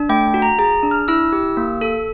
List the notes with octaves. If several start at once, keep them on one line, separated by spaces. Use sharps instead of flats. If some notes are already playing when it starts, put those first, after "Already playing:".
Already playing: D4
A3 G5
F#4
A#5
G#4 A#5
D4
F6
E4 E6
G4
A#3
A4